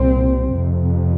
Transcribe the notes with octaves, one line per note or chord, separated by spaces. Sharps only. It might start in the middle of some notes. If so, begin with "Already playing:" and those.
Already playing: C2 A#2 C4
F2 C3